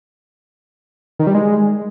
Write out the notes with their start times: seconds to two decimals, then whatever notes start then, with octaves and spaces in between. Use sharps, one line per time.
1.19 D#3
1.27 G3
1.34 G#3